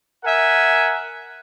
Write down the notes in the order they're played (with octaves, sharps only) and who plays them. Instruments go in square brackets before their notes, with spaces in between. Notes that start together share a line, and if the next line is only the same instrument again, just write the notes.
[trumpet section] A#4 E5 F#5 G#5